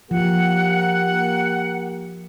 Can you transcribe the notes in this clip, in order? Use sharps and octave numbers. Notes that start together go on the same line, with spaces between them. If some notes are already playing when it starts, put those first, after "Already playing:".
F3 A#3 G4 A#4 F#5